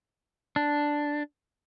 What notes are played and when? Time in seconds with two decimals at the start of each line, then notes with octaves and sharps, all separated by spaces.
0.56 D4